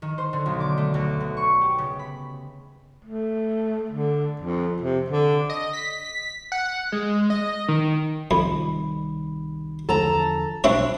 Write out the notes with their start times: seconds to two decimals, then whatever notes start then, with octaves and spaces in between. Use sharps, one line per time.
0.02 D#3
0.18 C5
0.33 D3
0.46 B1
0.60 D6
0.77 A3
0.94 D2
1.20 B3
1.37 C#6
1.61 G4
1.78 C#3
1.99 B5
3.05 A3
3.91 D3
4.41 F2
4.82 C3
5.10 D3
5.50 D#5
5.73 B6
6.52 F#5
6.92 G#3
7.30 D#5
7.68 D#3
8.31 C2 F2 D#3 G3 B5
9.89 E2 D3 F3 A4 A5 A#5
10.64 B1 F#3 G3 C4 D4 E4 C#5